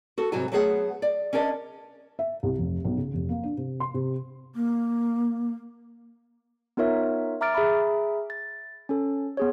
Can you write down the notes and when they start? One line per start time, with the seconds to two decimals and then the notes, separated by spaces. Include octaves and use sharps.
0.18 F#4 A4
0.32 G#2 C3 F#3 G3 F#4 G#5
0.52 F#3 A3 B3 G#4 F#5
1.02 D5
1.33 C#4 D4 A#4 D5 D#5
2.19 E5
2.43 C2
2.58 F1
2.85 B1
2.97 C#3
3.14 F1
3.29 A#3
3.43 D4
3.57 C3
3.80 C6
3.94 C3
4.55 A#3
6.77 B3 D#4 F4 A#4 C#5 E5
7.41 E5 A#5 D6 F6 A6 D7
7.55 G#4 E5 A#5 B5
8.30 A6
8.89 C#4 A4
9.37 B3 G#4 C#5